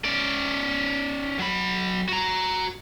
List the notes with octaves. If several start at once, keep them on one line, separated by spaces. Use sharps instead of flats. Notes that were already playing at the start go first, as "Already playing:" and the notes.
C#4 D5
F#3 B5
F#4 A#5